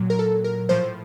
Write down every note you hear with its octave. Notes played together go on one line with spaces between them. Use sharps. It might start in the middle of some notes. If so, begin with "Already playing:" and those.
Already playing: A#2 F#3
A#4
A4
A#4
A2 F3 C5